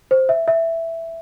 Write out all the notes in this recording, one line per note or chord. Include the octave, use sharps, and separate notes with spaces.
C5
E5
E5